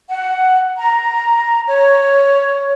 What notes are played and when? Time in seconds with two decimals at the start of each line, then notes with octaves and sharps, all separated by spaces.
0.09 F#5
0.78 A#5
1.67 C#5